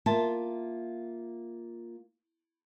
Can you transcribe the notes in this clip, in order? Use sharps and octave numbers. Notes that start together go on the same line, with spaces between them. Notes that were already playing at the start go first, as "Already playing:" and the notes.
A#3 F4 E5 A5